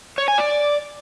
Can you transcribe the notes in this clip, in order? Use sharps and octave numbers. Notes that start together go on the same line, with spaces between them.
C#5
G#5
D5